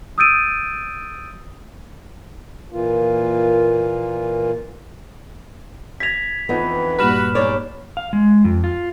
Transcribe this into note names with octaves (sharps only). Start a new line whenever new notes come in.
D#6 E6 G6 A6 D7 D#7
A#2 E3 A#3 F4
G#6 A#6 B6 F7
F2 E3 B3 D#4
G2 A#2 F#4 B4 B5 F6 E7
E2 G#2 C#5 D5
F5
G#3
F2
F4